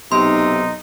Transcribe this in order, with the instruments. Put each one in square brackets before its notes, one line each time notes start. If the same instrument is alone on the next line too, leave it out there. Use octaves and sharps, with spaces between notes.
[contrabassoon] B1 [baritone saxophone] C3 [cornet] D#4 [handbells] C6